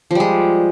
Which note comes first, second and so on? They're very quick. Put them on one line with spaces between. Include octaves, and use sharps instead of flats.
F3 G3 G#3